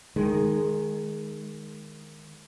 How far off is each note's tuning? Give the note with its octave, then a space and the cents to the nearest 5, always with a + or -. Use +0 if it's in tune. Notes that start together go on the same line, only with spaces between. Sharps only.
D#3 -15 G#3 +5